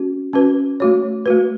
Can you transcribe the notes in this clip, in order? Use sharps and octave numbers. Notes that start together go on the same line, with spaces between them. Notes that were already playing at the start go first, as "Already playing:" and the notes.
Already playing: C#4 F#4
C#4 F#4 B4
A3 F#4 C#5
A3 F#4 B4